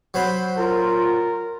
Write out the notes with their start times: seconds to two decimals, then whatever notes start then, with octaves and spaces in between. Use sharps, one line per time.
0.14 F#3 C5 B5
0.57 F4 A#4